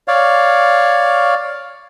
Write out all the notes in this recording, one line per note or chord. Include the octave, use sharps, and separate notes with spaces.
C#5 D5 F5